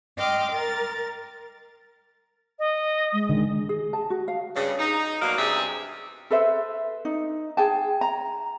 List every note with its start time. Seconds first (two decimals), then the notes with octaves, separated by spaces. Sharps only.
0.16 D#5 G5 C6 D6 F6
0.52 A#4 A6
2.59 D#5
3.13 G#3
3.29 D3 D#3
3.69 G#4
3.93 A5
4.10 F#4
4.28 F5
4.55 G2 C#3
4.79 D#4
5.21 B2 F#3 G3 A#3 A#4 F5
5.37 G2 C3 G#3 G#4 D5 E5
6.31 A4 B4 C5 E5
7.05 D#4
7.57 G#4 G5 A5
8.01 A#5